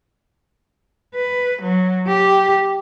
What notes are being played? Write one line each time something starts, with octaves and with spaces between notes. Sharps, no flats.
B4
F#3
G4